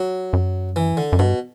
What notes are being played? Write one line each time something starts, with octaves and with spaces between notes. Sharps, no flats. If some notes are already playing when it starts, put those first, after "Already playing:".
Already playing: F#3
F#2
E3
D3
F#2
G2 B2